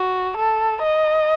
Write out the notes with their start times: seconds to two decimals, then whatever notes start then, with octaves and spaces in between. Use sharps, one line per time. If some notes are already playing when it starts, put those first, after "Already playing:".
Already playing: F#4
0.37 A4
0.83 D#5